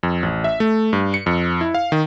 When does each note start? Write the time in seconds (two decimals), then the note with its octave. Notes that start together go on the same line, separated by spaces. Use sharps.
0.03 F2
0.23 A1
0.44 E5
0.60 A3
0.93 G2
1.14 C#7
1.26 F2
1.61 E4
1.74 F5
1.92 D#3